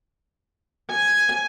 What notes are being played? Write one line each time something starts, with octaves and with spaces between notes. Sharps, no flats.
G#5